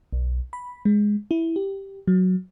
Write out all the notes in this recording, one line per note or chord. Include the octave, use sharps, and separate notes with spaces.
B1
B5
G#3
E4
G4
F#3